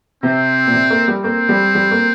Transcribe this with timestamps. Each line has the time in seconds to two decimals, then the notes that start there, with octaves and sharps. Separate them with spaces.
0.23 C3 C4
0.66 A#2
0.74 C3
0.90 A#3
1.08 G3
1.24 A#3 C4
1.49 G3
1.75 G3
1.91 A#3